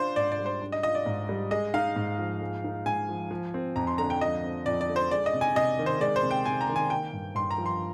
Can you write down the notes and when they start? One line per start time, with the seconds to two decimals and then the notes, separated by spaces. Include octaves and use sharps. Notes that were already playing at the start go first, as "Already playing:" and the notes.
Already playing: D4 F4 C5
0.16 G#2 D5
0.32 D5
0.38 G3
0.46 C5
0.62 D4
0.72 D#5
0.83 F4 D#5
0.95 D5
1.06 G#2
1.29 G3
1.51 G#3 D#5
1.74 D#4 F5
1.96 G#2
2.18 F3
2.42 G#3
2.64 D#4
2.85 G#2 G#5
3.09 F3
3.31 F3
3.54 C4
3.76 F2 A#5
3.87 C6
3.98 D3 A#5
4.10 G5
4.21 F3 D#5
4.44 C4
4.66 F2 D5
4.81 D5
4.89 D3
4.96 C5
5.11 G#3 D5
5.26 D#5
5.33 C3
5.41 G#5
5.55 C3 D#5
5.79 D#3
5.86 C5
6.00 G#3 D5
6.16 C5
6.23 C3
6.31 G5
6.46 C3 G#5
6.61 A#5
6.69 D#3
6.76 G#5
6.90 A#3 G5
7.13 G2
7.35 G2 C6
7.51 A#5
7.58 F3
7.66 C6